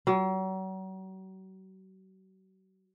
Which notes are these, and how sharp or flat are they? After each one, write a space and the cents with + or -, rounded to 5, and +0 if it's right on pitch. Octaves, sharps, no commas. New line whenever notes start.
F#3 +40